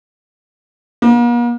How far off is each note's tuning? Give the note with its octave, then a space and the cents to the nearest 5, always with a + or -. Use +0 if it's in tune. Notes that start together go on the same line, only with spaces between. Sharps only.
A#3 +45